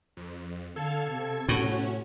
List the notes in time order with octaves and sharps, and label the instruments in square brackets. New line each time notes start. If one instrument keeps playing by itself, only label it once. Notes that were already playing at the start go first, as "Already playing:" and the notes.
[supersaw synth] F2
[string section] D3 F5 [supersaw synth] A4 G#6
[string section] C3
[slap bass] A2 [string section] C3 [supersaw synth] C#4 F#4